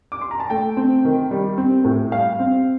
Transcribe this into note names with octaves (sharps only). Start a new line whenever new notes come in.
D6
C6
A#5
A5
A3 G5
C4
D#3
G3
C4
A2
G3 F5
C4